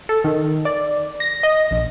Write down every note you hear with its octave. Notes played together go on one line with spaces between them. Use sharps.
A4
D#3
D5
A#6
D#5
A#1